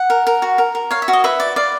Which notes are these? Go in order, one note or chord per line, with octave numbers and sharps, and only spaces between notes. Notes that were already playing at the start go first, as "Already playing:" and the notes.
Already playing: F#5
A#4
A#4
F#4
A#4
A#4
C#5 F5
E5
F#4
D#5
B4 E5
D5
D5 F5